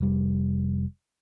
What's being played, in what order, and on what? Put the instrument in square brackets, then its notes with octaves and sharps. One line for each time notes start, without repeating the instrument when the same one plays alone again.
[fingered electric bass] F1 G3